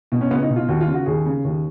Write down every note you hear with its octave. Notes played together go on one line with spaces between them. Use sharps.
B2
C#4
C#2 B3
D#4
B2
F4
D#2 F#4
F4
C#3
F#4
D#2 G#4
C#3
D#2